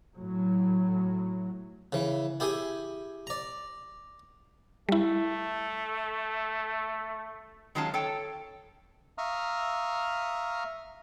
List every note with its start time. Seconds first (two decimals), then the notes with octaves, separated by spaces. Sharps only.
0.14 A2 F#3
1.92 C#3 E3
2.40 E4 G4 G#4 G#5
3.27 D5 A#5
4.89 G3 A3 E4
7.75 D#3 F#3 G#3 C#4 F4 A5
7.94 A4 C#5 G5
9.18 E5 F5 A#5 C#6 D#6 F6